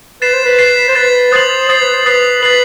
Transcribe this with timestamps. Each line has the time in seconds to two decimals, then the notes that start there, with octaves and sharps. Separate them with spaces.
0.22 B4 A6 C7 E7
0.34 C5
0.45 B4
0.59 A6 C7 E7
0.88 C5
0.95 B4 A6 C7 E7
1.32 C5 D#6 A6 C7 F#7
1.69 C5 D#6 A6 C7 F#7
1.81 B4
1.94 C5
2.06 B4 D#6 A6 C7 F#7
2.42 B4 D#6 A6 C7 F#7